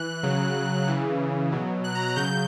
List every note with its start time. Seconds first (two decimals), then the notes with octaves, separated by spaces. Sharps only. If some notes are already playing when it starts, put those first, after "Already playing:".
Already playing: E3 F#6
0.23 C#3 F#3
0.87 C#3 E3
1.52 B2 F#3
1.84 F#6
1.95 A#5
2.06 A#5
2.16 C#3 F#3 G6